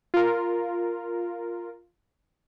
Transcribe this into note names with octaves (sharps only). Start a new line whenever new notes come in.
F4 A#4